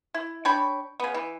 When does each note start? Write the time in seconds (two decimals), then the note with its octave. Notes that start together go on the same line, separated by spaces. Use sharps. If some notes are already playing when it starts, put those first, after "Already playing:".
0.14 E4
0.45 D4 C#5 G5 B5
1.00 C#3 B3
1.14 E3